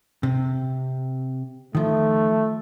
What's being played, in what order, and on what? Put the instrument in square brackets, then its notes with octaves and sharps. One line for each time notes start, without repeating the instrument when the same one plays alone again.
[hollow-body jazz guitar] C3
[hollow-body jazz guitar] D#3 F3 [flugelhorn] A3